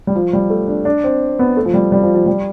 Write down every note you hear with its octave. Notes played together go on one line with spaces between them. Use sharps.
G3
F3
G3
A3
D4
D4
C4
B3
A3
F3
G3
G3
F3
F3
G3